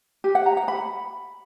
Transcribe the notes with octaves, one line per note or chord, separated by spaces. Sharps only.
G4
F#5
A#5
F#5
B5